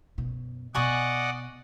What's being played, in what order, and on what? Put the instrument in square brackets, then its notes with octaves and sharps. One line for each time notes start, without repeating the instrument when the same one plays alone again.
[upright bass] F#2 B2
[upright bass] B2 B3 [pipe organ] D5 D#5 F#5 [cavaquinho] G#5 C#6 D#6